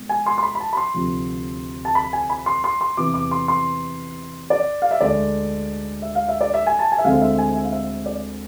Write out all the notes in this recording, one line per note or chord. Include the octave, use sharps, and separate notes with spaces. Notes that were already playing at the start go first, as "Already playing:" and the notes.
Already playing: B2 G#3
G#5
C6
C6
B5
B5
A5
B5
C6
D2 C3 F3
A5
B5
G#5
B5
C6
C6
C6
E2 C3 E3 D6
D6
C6
C6
D5
F5
E5
D2 D3 G#3 D4 D5
E5
F5
E5
D5
E5
G#5
A5
G#5
E5
D2 D3 G#3 C4 F5
E5
G#5
E5
F5
E5
D5